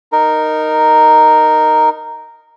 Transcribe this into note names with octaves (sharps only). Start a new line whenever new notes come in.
D#4 A#4